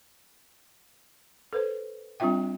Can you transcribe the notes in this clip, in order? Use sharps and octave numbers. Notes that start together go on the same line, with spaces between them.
A4 B4 C5
G3 C4 D4 F4 E5 G5